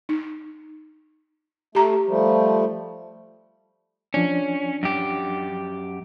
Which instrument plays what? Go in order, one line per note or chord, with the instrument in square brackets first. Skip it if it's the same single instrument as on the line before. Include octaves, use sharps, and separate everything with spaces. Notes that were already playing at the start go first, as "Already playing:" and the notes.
[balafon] D#4
[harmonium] A3 [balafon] G4 A#5
[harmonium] F3 G3 A3
[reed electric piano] F3 D4 [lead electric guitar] C#4
[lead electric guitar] F#2 G4